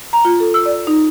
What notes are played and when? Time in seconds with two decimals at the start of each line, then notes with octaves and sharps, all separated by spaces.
0.13 A#5
0.25 F4
0.40 A4
0.54 E6
0.66 D5
0.87 D#4